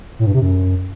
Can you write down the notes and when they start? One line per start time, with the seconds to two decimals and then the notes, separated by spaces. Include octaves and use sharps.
0.19 A2
0.27 G2
0.34 C3
0.42 F#2